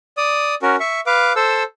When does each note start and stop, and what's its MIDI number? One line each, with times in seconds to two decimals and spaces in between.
0.17 0.55 74
0.17 0.55 87
0.62 0.76 61
0.62 0.76 66
0.62 0.76 70
0.80 1.00 76
0.80 1.00 85
1.07 1.33 71
1.07 1.33 77
1.07 1.33 86
1.36 1.63 69
1.36 1.63 72
1.36 1.63 88